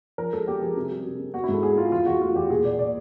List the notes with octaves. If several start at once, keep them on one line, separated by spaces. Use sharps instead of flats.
F3 A#4
G#3 A4
B3 G4
F3 G#4
C3
G3
C3
C3
B3 F#4
E4
G#2 A4
B3 G#4
G#3 F4
E2 F4
E2 F#4
A3 F4
E2 G4
A#2 G#4
A#2 D5
A#2 D5